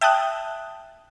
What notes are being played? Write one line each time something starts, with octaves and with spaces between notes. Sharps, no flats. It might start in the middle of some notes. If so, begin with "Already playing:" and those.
E5 G5 A5 D#6 F#6